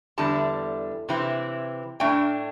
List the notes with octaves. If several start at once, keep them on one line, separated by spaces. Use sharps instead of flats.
E2 D3 G3 E4 A5
C3 E3 C4 E4
A2 A3 D4 G5